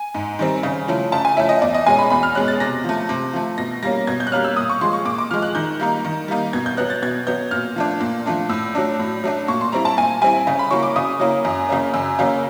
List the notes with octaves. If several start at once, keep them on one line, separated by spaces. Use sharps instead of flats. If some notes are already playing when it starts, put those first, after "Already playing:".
Already playing: G#5
G#2
D#3 G3 C4
C#3
F3 A3 C#4 E4
C#3 A5
G#5
F3 A3 C#4 E4 E5
D#5
E2 D5
D#5
B2 G#3 C#4 G#5
B5
E2 B5
F6
B2 G#3 C#4 F#6
A6
C3 A#6
F3 A3
C3
F3 A3
B2 A#6
G3 A#3 C#4 A#6
B2 G#6
G6
F#6
G3 A#3 C#4 F6
E6
A#2 D#6
C#6
F3 G#3 C6
C#6
A#2 D6
D6
F3 G#3 F6
F#6
D#3 G6
G3 A#3 D#4
D#3
G3 A#3 D#4
B2 G#6
G6
F#3 B3 F#6
A6
B2 G#6
F#3 B3 G6
A#2 F6
F3 A3 D4
A#2
F3 A3 D4
A2 E6
F#3 A3 D4
A2
F#3 A3 D4
A#2 C#6
C6
G3 C4 E4 A#5
A5
A#2 G#5
G3 C4 E4 G#5
C#3
B5
F#3 A#3 C#4 E4 C#6
D6
C#3 D#6
F#3 A#3 C#4 E4
F#2
C#3 F#3 A#3 C#4
F#2 E6
C#3 F#3 A#3 C#4